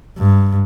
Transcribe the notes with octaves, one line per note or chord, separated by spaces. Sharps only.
G2